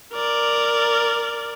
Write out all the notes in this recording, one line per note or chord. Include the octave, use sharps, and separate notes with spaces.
A#4 D5